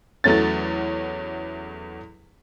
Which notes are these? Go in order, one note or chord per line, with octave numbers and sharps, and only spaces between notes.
E2 F#3 A3 C#4 A6